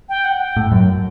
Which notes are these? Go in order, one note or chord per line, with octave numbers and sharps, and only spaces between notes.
G5
F#5
G5
A2
F#2